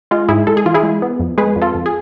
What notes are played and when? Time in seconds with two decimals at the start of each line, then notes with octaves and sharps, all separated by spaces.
0.11 G#3 F4
0.29 G#2 E4 G#4
0.47 G#3 A4
0.57 G#4
0.66 E3 F4
0.74 E4 G#4
0.83 G#3
1.02 B3
1.20 F2
1.38 G#3 G#4 B4
1.56 F2
1.62 F4 A4
1.75 F2
1.86 G#4